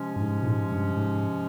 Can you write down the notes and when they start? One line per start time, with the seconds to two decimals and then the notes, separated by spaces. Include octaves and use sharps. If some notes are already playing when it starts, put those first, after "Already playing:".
Already playing: C3 F3 G#3 C#4
0.16 G2
0.21 G#2
0.43 A#2
0.46 G#2
0.72 G2
0.97 G#2